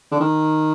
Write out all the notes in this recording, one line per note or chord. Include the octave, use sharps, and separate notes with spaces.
D3
D#3